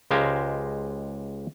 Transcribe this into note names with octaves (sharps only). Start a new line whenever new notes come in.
C#2 G#3 G4 C5 F5 A#5